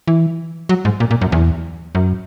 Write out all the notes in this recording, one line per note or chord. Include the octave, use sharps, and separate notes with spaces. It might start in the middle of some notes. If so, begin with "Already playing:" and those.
E3
F#3
G#2
A#2
A#2
F#2
E2
F#2